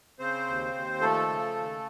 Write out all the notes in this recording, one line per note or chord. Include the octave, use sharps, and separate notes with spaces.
C#3 C4 C5
D#2
D#2
F3 A3 A4
C#3
D#2